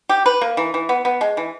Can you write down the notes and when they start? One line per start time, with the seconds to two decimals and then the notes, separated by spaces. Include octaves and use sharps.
0.09 G4
0.26 B4
0.41 A#3
0.57 E3
0.74 E3
0.89 B3
1.05 B3
1.21 G#3
1.37 E3